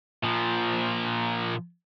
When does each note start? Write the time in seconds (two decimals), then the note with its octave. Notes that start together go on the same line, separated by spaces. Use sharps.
0.23 A#2 F3